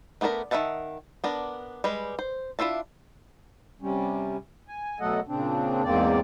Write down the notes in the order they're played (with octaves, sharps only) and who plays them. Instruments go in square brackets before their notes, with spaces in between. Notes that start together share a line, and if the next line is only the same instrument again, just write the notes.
[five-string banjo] A3 B3 D4 G#4 A#4
D#3 E4 E5 F#5 A5
B3 D4 A#4
G3 G#3 B4
C5
D4 E4 F4 E5 A5
[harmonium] C3 G3 C#4
G#5
B2 F#3 A3 A4 D#5 F#5
A#2 C#3 C4 D4
E2 G#2 A#3 C4 D5